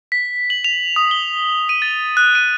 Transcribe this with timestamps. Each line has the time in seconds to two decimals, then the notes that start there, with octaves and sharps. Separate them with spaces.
0.12 B6
0.50 F#7
0.64 F7
0.96 D#6
1.11 G7
1.69 D#7
1.82 A6
2.17 F#6
2.35 D#7